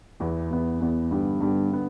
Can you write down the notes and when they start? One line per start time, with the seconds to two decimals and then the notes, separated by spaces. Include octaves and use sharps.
0.20 E2 E3 B3
0.51 E2 E3 B3
0.81 E2 E3 B3
1.11 G2 D3 B3 G4
1.40 G2 D3 B3 G4
1.72 D3 B3